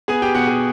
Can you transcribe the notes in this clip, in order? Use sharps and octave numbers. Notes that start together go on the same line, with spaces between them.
B3 G#4 G#5
G4 G5
B2 F#4 F#5
G#4 G#5